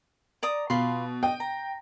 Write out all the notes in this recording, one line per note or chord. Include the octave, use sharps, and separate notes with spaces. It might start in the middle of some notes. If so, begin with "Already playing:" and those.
D5 A#5 D#6
B2 F4 B5 C6
D#5 G5
A#5